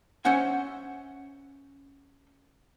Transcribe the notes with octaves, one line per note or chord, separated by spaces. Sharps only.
C#4 C5 E5 F#5 G#5